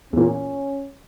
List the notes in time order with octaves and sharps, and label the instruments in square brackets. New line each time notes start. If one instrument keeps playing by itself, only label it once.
[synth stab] E2 A#2 [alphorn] C#4